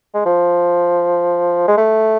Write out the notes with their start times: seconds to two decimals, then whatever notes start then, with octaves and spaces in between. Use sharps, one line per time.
0.14 G#3
0.26 F3
1.68 G#3
1.77 A3